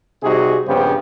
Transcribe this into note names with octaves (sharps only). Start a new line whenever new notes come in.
C3 G3 D#4 F#4 G#4
A#1 G2 C#3 B3 G4 C5